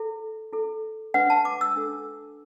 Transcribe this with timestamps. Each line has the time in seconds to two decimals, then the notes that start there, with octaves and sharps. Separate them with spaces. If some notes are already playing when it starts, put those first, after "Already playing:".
Already playing: E4 A4
0.53 E4 A4
1.14 D4 B4 F#5
1.30 A5
1.45 D6
1.61 E6
1.76 D4 A4